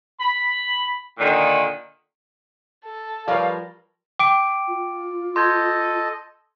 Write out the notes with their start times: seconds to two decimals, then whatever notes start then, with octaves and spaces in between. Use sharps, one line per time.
0.19 B5
1.19 A#2 D3 D#3
2.85 A4
3.28 F3 G3 A#4 B4 C#5 D5 F5
4.19 G5 D6 D7
4.68 F4
5.36 A4 D#5 C6 G6 G#6